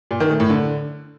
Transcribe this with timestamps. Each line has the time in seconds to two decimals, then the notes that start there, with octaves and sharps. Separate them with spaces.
0.11 A#2
0.20 D#3
0.30 A3
0.40 A2
0.50 D3